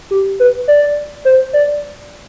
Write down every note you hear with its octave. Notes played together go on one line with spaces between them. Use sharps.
G4
B4
D5
C5
D5